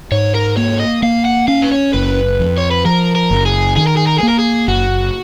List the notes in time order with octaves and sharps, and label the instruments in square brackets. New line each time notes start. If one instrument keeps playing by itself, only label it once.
[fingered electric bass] G#2 [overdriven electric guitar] C#5
[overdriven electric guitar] A#4
[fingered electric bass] A#3 [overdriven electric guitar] C#5
[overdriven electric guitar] D#5
[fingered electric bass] A#3 [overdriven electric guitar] F5
[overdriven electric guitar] F#5
[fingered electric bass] C#4 [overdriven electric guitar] F5
[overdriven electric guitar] B4
C#5
[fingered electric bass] F#1 [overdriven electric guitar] B4
[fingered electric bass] F2
[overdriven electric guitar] C#5
B4
[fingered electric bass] F3 [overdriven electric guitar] A#4
[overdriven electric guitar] A#4
[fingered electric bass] F#1
[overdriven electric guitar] G#4
[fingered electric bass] D#3 [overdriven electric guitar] G#4
[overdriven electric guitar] A#4
G#4
A#4
[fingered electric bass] A#3 [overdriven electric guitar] G#4
[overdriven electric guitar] A#4
G#4
[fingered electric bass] F#1 [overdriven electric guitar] F#4